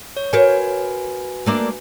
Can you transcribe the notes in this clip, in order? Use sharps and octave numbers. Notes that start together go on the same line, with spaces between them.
C#5
F#4 A#4 B4 C#5 G#5
A3 A#3 D4